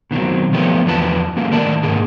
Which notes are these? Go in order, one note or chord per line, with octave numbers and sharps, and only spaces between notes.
B2 D#3 F#3 C4
F3 G3 A3 B3 G4 C#5
E2 F3 D4 B4 A5
G#3 A#3 C#4 G4
A2 D#3 A#4 D5 A5
G#2 A#3 G#4 A#4